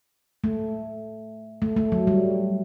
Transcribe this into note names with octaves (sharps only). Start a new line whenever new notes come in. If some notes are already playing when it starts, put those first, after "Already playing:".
A3
A3
A3
F#3
G3